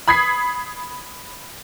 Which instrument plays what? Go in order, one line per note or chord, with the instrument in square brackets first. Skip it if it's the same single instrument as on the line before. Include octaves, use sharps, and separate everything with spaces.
[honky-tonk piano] B5 D#6 G#6 B6 C7